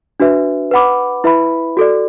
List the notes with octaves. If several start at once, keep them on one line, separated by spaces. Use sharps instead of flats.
D4 F#4 B4 E5
B4 F#5 B5 D6
E4 B4 E5 B5
F#4 A4 D5